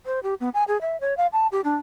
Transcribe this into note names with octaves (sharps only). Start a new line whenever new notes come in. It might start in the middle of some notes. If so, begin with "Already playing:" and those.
C5
G4
B3
G#5
G#4
E5
C#5
F5
A5
G4
D4